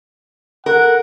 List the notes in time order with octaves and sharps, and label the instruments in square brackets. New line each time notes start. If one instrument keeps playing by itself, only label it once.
[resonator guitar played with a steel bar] A#4 [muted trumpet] F#5